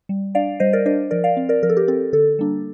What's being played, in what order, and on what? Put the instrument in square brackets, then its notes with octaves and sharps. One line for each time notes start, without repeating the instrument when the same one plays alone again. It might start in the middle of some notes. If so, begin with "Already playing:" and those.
[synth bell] G3
D4 D5 F5
G3 C5 D#5
A#4 D5
D4 C5 D#5
F3 A#4 D5
D5 F5
C4
A#4 D5
F3 A#4
A4
G4 A#4
C4 A4
D3 A4
G3 A#3 D4